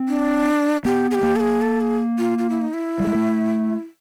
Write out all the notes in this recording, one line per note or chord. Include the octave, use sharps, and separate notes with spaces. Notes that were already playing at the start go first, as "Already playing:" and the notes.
Already playing: C4
D4
B3 G4
G#4
G4
A#3
A4
G#4
A4
G#4
F4
F4
E4
D#4
E4
G3
G#3
A3